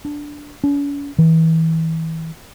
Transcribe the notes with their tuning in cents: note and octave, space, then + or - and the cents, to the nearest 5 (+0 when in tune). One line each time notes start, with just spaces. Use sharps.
D4 +0
C#4 +45
E3 -30